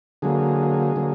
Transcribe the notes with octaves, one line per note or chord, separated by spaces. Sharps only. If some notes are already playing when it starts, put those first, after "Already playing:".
D3 F#3 A#3 G#4
D3 F#3 A#3